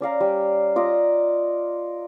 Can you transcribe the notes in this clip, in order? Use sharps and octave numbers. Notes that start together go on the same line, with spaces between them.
C#4 D5 F5 A#5
G3
F4 D5 D#5 A#5